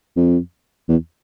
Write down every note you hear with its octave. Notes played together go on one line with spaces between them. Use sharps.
F2
E2